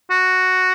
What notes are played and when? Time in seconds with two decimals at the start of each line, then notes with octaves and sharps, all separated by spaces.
0.11 F#4